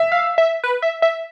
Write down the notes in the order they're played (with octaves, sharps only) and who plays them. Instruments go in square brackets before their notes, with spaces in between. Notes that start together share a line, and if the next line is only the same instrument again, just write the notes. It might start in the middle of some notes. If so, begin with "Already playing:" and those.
Already playing: [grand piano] E5
[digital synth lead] F5
E5
B4
E5
E5